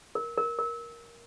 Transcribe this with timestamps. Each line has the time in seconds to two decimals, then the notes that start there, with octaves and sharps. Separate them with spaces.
0.15 A#4
0.37 A#4
0.59 A#4